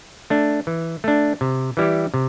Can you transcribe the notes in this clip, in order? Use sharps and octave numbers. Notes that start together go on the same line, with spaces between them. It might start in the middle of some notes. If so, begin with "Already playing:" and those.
A3 D4
E3
A3 D4
C3
E3 G3 E4 G4
C3